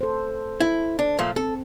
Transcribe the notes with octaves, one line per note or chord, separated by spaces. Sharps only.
A4 C5
E4
D4
A#2 F3 A3
C4 A4